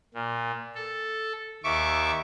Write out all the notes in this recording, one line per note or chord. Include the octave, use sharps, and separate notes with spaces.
A#2
A4
D#2 E5 C#6 D6